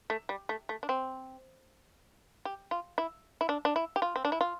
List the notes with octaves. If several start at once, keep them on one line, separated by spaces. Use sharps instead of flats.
A3
G3
A3
A3
D4
C4
G4
F4
E4
E4
D4
D4
E4
G4
F4
C4
D4
E4
F4